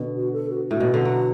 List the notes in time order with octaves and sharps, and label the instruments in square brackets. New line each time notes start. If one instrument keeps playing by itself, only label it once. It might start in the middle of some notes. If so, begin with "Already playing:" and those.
Already playing: [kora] B2 D3
[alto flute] F#4
A4
F#4
[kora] A2 [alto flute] F#4
[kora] B2
D3
F#3